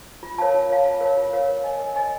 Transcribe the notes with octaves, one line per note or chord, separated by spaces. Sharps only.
F4
A#4 C#5 F5 A5
F4
A#4 C#5 F5 A5
F4
A#4 C#5 F5 A5
F4
A#4 C#5 F5 A5
A#4
D#5 G#5
A#4
D#5 G#5